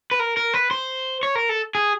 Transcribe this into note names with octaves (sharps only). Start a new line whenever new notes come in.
B4
A#4
A#4
B4
C5
C#5
A#4
A4
G#4